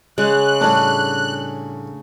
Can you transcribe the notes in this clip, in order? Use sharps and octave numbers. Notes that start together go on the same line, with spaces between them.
C#3 G#3 F#6
A2 G3 C#4 D4